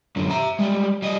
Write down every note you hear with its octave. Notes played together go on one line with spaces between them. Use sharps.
F#2 D3
E5 A#5
G3 G#3
G3 D#5